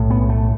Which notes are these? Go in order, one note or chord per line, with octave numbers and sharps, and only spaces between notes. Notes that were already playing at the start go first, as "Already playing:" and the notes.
Already playing: B1 A2
B3
A3